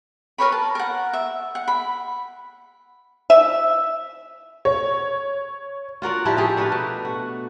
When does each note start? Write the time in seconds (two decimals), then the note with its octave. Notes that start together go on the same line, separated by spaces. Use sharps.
0.38 A#4 B4 C#5 B5
0.52 A5
0.75 A#4 F#5
1.13 E5
1.55 F#5
1.68 B5
3.30 E5
4.65 C#5
6.02 F4 F#4 A#4 D5
6.25 F3 D4 E4 G4
6.37 A3 G4 G#4 F5
6.57 A3 D4 A#4 B4
6.72 B2
7.05 F#4